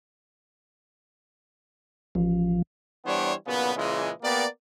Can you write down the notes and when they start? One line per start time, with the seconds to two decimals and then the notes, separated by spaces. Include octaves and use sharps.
2.15 A1 F3
3.05 E3 G3 B3 D4 C5 C#5
3.46 B1 A#2 C#3 B3
3.76 A#2 C#3 E3 G#3
4.22 A#3 B3 G4 A#4 D5